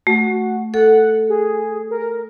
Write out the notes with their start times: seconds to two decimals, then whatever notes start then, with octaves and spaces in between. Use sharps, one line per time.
0.07 A3 F#4
0.74 A4 F#5
1.30 G#4
1.91 A#4